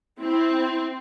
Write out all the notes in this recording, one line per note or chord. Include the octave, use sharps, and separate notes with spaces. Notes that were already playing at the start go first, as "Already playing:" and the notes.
C4 E4